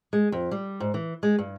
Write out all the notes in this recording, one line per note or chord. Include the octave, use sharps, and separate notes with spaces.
G#3
F2
G3
G#2
E3
G#3
G2